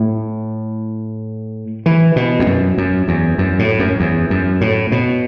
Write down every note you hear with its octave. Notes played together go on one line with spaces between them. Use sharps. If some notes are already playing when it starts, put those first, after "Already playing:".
Already playing: A2
E3
B2
E2
F#2
F#2
E2
F#2
A2
F#2
E2
F#2
A2
B2